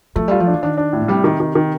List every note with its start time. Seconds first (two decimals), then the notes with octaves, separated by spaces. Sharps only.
0.16 F3 A3
0.28 G3 F4
0.40 F3
0.47 D4
0.54 D3
0.63 D#3 D4
0.77 D4
0.93 A2
1.01 A#2
1.08 C3 G3
1.24 D#3
1.40 D#3
1.55 D#3